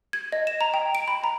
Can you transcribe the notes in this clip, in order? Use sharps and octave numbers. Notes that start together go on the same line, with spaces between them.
G#6
D#5
E7
A#5
G5
D7
B5
A#5